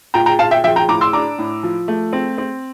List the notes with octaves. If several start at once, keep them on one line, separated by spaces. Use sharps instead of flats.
A#2 G5 A#5
G5 A#5
A#2 F5 A5
E5 G5
F3 E5 G5
G5 A#5
A2 A#5 D6
C6 E6
D4 A#5 D6
A2
F3
A3
C4
C4